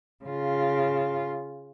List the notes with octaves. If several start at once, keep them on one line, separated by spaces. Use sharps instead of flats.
C#3 F4